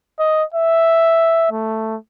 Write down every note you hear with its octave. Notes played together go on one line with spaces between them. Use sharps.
D#5
E5
A3